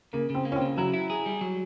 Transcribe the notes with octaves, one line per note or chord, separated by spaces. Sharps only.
C#3 A#3
C#3 C4
A#3
C#4
C4
C#3
F#3 E4
E4
G#4
G3
F#3